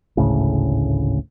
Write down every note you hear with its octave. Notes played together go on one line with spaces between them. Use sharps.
G#1 D2 A2 C#3